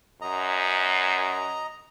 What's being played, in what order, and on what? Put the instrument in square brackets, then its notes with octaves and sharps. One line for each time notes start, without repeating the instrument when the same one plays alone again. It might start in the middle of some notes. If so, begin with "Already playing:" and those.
[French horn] F#2 [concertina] D#5 A#5